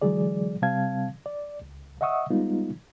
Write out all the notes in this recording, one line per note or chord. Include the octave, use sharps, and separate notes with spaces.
D3 E3 F#3 G#3 G#4 D5
C3 G3 C4 F5 A5 G#6
D5
C#2
D#5 E5 F#5 C#6 D#6 E6
G3 G#3 B3 D#4 F4